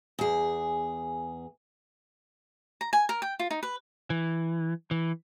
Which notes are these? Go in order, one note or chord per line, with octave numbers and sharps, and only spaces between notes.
E2 G#4
A#5
G#5
A#4
G5
F4
D#4
B4
E3
E3